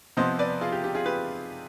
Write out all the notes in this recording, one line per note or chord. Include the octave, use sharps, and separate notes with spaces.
C3 F3 B3 C5 D#5
B4 D5
F4 G#4
G4
G4
F4 G#4
G4 B4